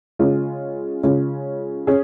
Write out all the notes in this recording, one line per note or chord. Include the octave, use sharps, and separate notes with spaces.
C#3 G#3 C#4 F4
C#3 G#3 C#4 F4
C#4 G#4